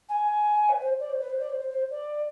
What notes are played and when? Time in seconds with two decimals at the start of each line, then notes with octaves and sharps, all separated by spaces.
0.09 G#5
0.69 B4
0.79 C5
1.00 D5
1.10 C5
1.20 B4
1.30 C5
1.39 D5
1.50 C5
1.60 C5
1.70 C5
1.90 D5